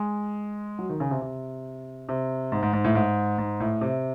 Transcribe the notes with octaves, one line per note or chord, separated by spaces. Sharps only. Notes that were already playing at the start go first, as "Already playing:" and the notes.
Already playing: G#3
F#3
D#3
C#3
C3
C3
C3
G#2
G#2
G#2
A2
G#2
G#2
A2
C3